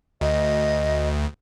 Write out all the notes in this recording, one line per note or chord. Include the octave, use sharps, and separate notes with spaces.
D2 D#5